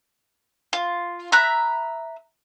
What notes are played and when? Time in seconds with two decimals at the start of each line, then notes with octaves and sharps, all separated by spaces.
0.73 F4
1.32 E5 A#5 B5 F#6